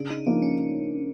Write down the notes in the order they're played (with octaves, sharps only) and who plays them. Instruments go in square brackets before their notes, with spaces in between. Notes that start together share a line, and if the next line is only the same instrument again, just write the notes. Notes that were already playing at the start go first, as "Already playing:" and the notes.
Already playing: [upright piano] C#3 [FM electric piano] D4
[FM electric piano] D#4
[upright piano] F3 A#3 D#4 [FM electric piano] D4
[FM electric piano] C#4